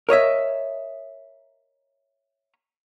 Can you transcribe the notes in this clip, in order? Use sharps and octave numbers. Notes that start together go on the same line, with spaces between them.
A#4 C#5 D#5 E5